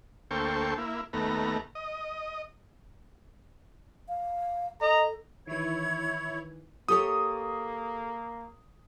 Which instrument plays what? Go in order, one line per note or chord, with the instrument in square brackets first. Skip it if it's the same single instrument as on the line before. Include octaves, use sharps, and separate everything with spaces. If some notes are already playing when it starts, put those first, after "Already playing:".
[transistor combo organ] D2 A#3 A4 C5 G5 C#6
A#3 E4
D#2 A3 B3 A#5
D#5
[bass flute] F5
[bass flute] A4 [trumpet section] D#5 A#5
[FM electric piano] D#3 E3 [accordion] E4 C#5 [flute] G#6
[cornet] A#3 [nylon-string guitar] G4 A4 C#5 [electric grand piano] D#6